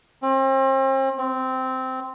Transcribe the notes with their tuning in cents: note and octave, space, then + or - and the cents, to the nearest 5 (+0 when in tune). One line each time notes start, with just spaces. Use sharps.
C4 +40
C4 -10